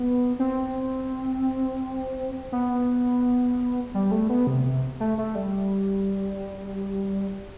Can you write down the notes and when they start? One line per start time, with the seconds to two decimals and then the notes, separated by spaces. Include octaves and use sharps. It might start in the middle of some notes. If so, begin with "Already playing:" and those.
Already playing: B3
0.39 C4
2.52 B3
3.94 G3
4.11 A3
4.29 B3
4.47 C3
4.65 C3
5.00 A3
5.18 A3
5.35 G3